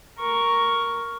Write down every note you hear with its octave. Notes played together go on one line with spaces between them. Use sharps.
A#4 C#6